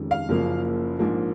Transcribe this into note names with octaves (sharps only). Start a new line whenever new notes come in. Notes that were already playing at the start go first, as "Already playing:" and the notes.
Already playing: F1 F2 D#3 G#3 C#4
F5
F#1 F#2 C#3 F3 A#3
A#1 G#2 F3 A#3